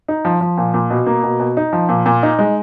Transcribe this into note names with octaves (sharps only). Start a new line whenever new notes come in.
D#4
F3
F3
A#2
A#2
B2
A#3
B2
B2
D#4
F3
A#2
A#2
D#4
G#3